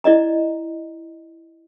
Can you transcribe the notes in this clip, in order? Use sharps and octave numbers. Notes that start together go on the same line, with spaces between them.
E4 D5 D#5 A#5